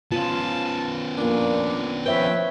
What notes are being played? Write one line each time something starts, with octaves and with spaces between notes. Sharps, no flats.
B3 C#4 F4 A5
F2 A#2 A#3 D4
F3 B4 C#5 E5 G5